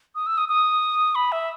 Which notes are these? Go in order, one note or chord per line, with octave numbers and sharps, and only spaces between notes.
D#6
E6
D#6
D#6
B5
E5